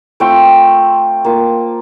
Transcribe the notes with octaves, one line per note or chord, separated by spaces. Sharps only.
A3 C4 F4 G5
A#3 F4